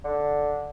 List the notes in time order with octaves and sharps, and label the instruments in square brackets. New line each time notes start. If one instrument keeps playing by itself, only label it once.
[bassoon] D3